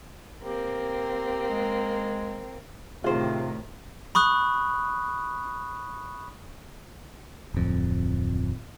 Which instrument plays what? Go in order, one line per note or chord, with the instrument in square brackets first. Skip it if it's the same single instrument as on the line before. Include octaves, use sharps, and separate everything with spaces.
[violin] A#3 C4 [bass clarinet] G4
[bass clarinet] G#3
[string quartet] A2 D#3 [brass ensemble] C3 [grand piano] F4 [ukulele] G#4 C5
[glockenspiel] B5 C#6 D#6 F#6
[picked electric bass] D1 F2